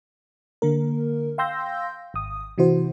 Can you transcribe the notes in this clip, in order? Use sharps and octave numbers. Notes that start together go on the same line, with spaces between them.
D3 A#3 A#4
F5 G5 C6 E6 G6 A#6
G#1 D#6
C3 E3 E4 F#4 C5